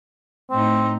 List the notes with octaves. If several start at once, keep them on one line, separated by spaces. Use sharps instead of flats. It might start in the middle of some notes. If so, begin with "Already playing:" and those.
A2 C4 D#4